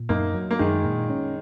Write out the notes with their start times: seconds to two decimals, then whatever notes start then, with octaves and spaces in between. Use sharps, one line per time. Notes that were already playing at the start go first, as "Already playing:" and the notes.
Already playing: A#2
0.09 F#2 A#3 D#4
0.34 F#3
0.51 A#3
0.59 F#2 D#3 G#3
0.84 A#2
1.10 C#4